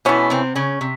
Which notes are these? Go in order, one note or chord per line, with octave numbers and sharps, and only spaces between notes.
B2 E3 A3 B3 C#4
C3 C4
C#3 C#4
C3